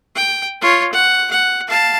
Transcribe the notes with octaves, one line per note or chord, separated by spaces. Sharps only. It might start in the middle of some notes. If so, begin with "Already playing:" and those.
G5
F4 C#5
F#5
F#5
F5 A5